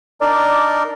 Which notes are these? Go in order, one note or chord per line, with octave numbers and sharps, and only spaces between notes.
D4 D#4 A#4 D5